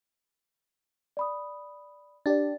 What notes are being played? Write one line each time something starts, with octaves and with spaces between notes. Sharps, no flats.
D5 B5 D#6
D4 G4 D5 A6